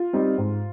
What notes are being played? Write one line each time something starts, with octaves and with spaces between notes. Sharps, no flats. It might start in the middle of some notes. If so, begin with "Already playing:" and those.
Already playing: F4
G3 C4 D#4
G#2